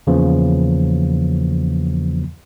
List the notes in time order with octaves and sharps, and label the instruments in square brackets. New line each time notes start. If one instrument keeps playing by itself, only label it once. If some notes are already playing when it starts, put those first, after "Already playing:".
[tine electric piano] E2 C#3 E3 F3 A#3